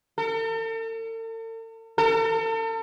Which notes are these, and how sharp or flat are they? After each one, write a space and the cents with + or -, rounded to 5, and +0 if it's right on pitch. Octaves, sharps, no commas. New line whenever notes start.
A4 +45
A4 +40